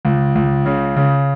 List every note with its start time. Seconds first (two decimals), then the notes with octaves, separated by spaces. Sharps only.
0.05 C#2
0.35 C#2
0.66 C#3
0.96 C#3